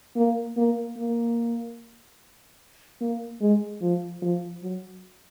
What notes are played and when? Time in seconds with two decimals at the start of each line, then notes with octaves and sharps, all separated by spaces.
0.16 A#3
0.57 A#3
0.97 A#3
3.01 A#3
3.41 G#3
3.81 F3
4.22 F3
4.63 F#3